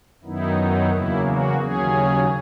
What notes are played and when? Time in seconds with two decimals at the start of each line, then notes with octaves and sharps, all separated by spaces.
0.23 F#2 D#3 F#3 B3 D#4 E4
0.57 E4
0.91 E2 C#3 F#3 A#3 E4
1.26 F#4
1.59 D#2 C#3 F#3 C#4 G#4